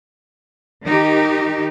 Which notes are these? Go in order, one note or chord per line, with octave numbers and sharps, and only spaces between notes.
D#3 D#4 G4